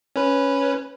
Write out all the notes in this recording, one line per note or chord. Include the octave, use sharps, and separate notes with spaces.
C#4 B4